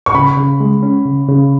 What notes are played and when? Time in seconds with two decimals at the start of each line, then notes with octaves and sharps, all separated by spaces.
0.06 C#6
0.15 C#3 B5
0.37 C#3
0.60 G#3
0.83 C#4
1.06 C#3
1.29 C#3